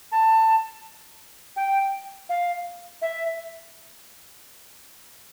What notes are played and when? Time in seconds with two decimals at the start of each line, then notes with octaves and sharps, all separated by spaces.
0.12 A5
1.56 G5
2.29 F5
3.02 E5